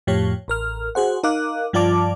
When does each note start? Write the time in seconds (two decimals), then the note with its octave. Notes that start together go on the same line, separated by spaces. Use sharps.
0.07 F2 A2 F3 G4 C#5
0.48 A1 A#4 F6
0.95 F#4 G#4 C5 F#5
1.23 D#4 A#4 F5 D6 F#6
1.73 G2 F3 F4 D5 A5 D6